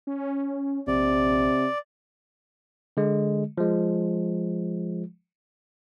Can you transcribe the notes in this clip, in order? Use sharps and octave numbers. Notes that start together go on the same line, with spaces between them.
C#4
A#1 C3 D5
D3 G#3
F3 G#3